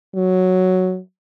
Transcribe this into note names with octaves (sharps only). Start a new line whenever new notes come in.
F#3